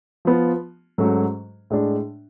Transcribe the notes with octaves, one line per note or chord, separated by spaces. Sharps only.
F3 B3 F4
G#2 F#3 A3 C#4 F#4
A2 G#3 D4